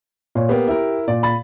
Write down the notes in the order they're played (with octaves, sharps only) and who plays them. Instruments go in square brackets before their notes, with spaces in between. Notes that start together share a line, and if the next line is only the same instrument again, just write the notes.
[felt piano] A#2 C#5
[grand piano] A#3 B3 [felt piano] G4
[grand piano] E4 A#4
[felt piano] A#2 [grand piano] D5
[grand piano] B5 A6